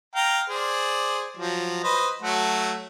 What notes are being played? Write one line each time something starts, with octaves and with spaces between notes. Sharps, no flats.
F5 G5 A#5
G#4 C5 D5
F3 F#3
B4 C5 D#5
F#3 A3 F#4